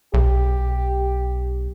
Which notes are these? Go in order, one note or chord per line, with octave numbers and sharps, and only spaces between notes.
B1 G4